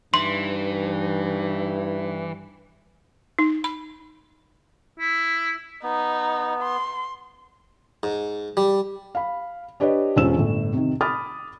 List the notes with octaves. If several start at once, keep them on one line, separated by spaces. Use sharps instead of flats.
G2 E3 D#4 C6
D#4
B5
E4
B3 D#4
C6
G#2
G3
F5 B5
D4 G4 B4 C#5 D#5
E1 C#4 F4 C5 E6 E7
G1 A2
C3 D#3
B5 D6 D#6 F6 A6